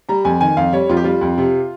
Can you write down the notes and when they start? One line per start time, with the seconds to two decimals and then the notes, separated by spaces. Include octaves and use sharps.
0.09 G3 A#5
0.25 F2 G#5
0.41 D#3 G#5
0.57 F2 F5
0.73 G3 C#5
0.89 F2 F4
0.97 G4
1.04 G3 F4
1.21 F2
1.38 C3